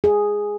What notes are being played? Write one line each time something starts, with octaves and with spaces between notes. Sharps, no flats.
G#4